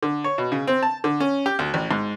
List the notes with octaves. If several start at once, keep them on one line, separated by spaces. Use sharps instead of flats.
D3
C#5
B2
C#3
C4
A5
D3
C#4
G4
D2
A1
G#2